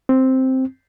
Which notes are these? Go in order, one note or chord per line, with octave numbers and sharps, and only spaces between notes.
C4